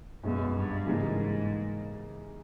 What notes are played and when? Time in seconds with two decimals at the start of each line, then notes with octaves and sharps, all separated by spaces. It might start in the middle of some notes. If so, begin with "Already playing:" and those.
0.24 B1 F#2 B2 G#3 B3
0.55 G2
0.86 G#2 C#3 E3 G3 A#3 D#4